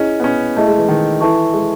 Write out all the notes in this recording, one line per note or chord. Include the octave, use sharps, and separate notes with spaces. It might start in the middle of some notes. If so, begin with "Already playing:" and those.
Already playing: C#4 E4 G#4 D#5
B3
C#4
A3 E4 G#4 D#5 A5
G#3
E3
D#3
E3 E4 A4 E5 A5 C#6
G#3